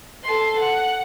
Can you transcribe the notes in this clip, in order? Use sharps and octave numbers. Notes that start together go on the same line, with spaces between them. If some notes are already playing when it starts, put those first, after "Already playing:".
A4 C6
F#5